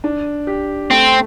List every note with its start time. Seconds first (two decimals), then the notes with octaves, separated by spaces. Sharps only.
0.04 D4
0.47 G4
0.91 A3 C4